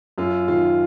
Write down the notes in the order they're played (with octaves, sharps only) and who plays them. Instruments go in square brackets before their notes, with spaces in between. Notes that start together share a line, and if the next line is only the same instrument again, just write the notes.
[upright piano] F#2 [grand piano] F4
[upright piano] D#3 [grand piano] F4